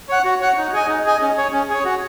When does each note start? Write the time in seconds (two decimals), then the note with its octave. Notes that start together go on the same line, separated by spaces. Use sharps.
0.09 C#5 F#5
0.24 F#4
0.40 C#5 F#5
0.57 D#4
0.73 G#4 D#5 G#5
0.88 D#4
1.05 G#4 D#5 G#5
1.21 C#4
1.37 G#4 C#5
1.53 C#4
1.69 G#4 C#5
1.85 F#4